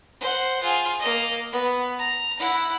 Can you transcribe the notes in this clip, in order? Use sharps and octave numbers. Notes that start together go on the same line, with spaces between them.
C5 F#5
F4 G#4
A#3 D#5
B3
A#5
E4 F#5